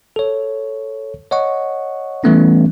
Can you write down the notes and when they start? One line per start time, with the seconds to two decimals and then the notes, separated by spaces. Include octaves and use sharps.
0.16 A4 C#5
1.31 C#5 D#5 F#5 C#6
2.24 E3 G3 A3 B3 C#4